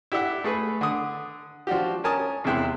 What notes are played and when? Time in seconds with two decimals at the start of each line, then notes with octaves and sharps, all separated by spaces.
0.12 E4 G4 D5 E5 F#5
0.44 A3 G#4 B4
0.81 D3 D#6
1.67 F3 D4 F#4 G4
2.04 C#4 A#4 G#5 A5 D#6
2.44 E2 C3 G#3 E4 G5 F#6